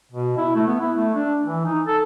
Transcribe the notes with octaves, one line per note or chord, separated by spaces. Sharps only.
B2
E4
A3
B3
E4
A3
D4
E3
D#4
A4